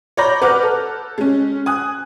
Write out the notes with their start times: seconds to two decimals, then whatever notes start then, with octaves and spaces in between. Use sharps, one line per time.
0.17 C#5 D5 A#5 B5 G6 A#6
0.42 B4 F#5 D6 F6 F#6
0.62 A4
1.18 G#3 C#4
1.66 G#5 D#6 F#6